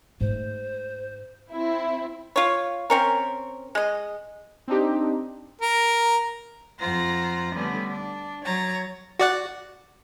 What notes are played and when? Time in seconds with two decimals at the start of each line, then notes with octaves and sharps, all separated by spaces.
0.21 G#2 A3 C5
1.52 C4 E4
2.36 F4 C#5
2.90 C4 C#4 A#4
3.75 G#3 D#5
4.68 C4 D4 D#4 G4
5.61 A#4
6.78 F2 F4 C5 F#5 A#5 A#6
7.55 D3 G3 A3 B3 C#4
7.87 D4
8.44 F#3 C#5 A#5 A6
9.19 F#4 D5 F#5